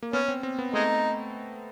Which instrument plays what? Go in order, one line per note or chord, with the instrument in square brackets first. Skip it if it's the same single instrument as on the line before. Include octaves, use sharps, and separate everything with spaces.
[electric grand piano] A#3
[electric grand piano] B3 [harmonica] C#4
[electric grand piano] C4
C4
B3
[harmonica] G#3 D#4 [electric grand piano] A3